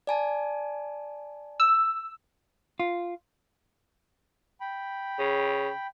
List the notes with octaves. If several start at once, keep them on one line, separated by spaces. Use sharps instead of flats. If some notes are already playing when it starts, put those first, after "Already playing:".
D5 G#5 A5
E6
F4
G5 B5
C#3